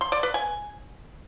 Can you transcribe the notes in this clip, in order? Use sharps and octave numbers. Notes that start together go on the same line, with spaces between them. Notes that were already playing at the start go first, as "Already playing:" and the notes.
C6
D5
B4
G#5